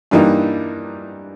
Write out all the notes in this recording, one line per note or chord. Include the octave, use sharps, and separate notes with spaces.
G2 E3 G3 A#3 D#4